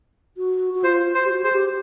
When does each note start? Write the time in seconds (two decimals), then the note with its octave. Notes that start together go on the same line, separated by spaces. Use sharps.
0.37 F#4
0.75 F#4
0.84 F4 C5
1.15 C5
1.25 G4
1.29 F#4
1.44 G#4 C5
1.52 G4